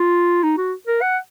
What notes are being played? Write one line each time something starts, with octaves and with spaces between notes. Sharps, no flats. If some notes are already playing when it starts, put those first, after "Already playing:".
Already playing: F4
D#4
F#4
A#4
F#5